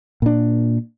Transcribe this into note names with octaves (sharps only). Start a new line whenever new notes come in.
A#2 D4